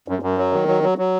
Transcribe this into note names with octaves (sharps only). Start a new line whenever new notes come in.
F#2
F#2
F#3
D#3
F#3
F#3
F#3